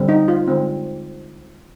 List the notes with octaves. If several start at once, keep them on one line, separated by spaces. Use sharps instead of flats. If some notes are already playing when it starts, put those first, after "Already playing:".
Already playing: D3 G3 C4
D#4
F4
D3 G#3 C4